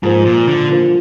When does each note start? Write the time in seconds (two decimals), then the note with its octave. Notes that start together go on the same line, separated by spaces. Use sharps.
0.03 G#2 F3 A#3 F4 C5
0.25 A#2
0.48 D3
0.70 F3 A#3 F4 C5